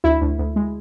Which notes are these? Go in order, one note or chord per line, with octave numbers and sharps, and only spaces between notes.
D2 E4
D2
D2
G#3